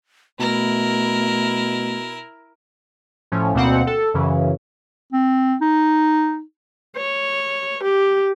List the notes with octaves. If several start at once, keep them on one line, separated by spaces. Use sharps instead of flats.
B2 A3 E4 A#4
A2 F3 C#4
D2 B2 A#3 C4 F#5
A4
F#2 C#3 E3
C4
D#4
C#5
G4